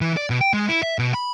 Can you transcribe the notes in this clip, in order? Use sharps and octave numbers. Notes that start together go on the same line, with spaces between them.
E3
D5
B2
G5
G#3
E4
E5
B2
B5